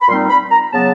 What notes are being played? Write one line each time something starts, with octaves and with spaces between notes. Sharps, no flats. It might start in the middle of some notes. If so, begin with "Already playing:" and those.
B5
A#2 G3 C4 D#4 C6
B5
A#5
C#3 F#3 B3 A5